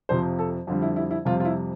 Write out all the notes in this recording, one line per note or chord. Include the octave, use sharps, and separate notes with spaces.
F2 C3 F3 C5
A4
F2 D3 G3 F4
E4
E4
E4
F2 C3 G3 F4
F4
E4